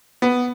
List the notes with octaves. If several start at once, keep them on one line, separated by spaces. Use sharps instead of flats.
B3